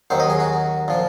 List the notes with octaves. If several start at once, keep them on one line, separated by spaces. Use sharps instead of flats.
D#2 D#3 F#3 C5
D#5
G#4
F#4
A#2 F3